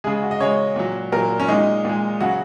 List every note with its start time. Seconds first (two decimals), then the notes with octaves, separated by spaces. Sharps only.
0.04 C#3 G#3 G#4
0.22 F#4
0.31 D#5
0.40 C#3 G#3 C#5
0.76 A#2 F#3
1.12 A#2 A#4
1.16 F#3
1.40 C#4
1.48 A#2 G#3 D#4
1.85 A#2 G#3
2.20 C#3 F#3 F#4